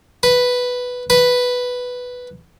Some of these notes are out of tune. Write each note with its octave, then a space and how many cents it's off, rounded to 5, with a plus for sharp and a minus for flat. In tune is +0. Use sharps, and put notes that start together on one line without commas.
B4 +0
B4 +0